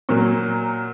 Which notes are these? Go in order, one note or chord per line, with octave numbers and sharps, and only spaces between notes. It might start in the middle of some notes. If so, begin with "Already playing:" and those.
A#2 F#3 A#3